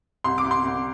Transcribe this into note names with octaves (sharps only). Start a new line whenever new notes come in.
C2 C6
D6
C2
C6
C2